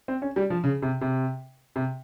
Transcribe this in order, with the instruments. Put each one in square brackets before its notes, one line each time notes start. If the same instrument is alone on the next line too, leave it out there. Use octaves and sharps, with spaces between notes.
[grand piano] C4
C#4
G3
F3
C#3
C3
C3
C3